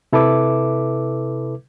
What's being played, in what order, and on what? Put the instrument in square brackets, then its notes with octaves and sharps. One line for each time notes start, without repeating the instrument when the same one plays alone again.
[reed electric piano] C3 E4 A4 B4 E5 D6